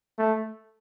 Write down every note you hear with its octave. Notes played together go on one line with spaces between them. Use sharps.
A3